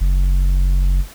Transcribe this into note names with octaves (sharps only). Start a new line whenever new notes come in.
F#1